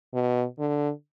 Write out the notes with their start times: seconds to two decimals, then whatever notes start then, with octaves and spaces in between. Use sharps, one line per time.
0.14 B2
0.59 D3